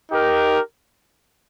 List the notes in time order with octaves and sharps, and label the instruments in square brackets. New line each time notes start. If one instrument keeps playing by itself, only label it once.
[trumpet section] D#4 G4 A#4